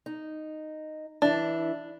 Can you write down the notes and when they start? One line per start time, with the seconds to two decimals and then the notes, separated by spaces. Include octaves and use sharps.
0.06 D#4
1.22 E3 D4 E4